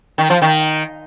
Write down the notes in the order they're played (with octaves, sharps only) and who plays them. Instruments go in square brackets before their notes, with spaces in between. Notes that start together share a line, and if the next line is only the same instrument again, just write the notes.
[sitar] D#3
F3
D#3